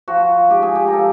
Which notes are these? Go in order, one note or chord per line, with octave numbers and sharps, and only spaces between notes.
F3 F#4
G#2 G4
G#4
G4
A#4
F3 A4